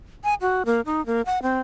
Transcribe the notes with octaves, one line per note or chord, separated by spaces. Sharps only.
G#5
F#4
A#3
D#4
A#3
F#5
C4